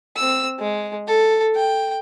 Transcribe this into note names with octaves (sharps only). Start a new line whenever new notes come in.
C4 E6
G#3
A4
G5